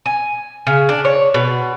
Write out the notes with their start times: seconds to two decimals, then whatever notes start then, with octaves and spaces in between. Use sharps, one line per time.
0.06 G#5
0.67 C#3
0.89 D4
1.05 C#5
1.34 B2